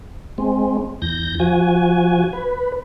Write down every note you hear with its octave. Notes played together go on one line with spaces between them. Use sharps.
G#3 C4
E2 G6 A#6
F3 F#4 G#5
B4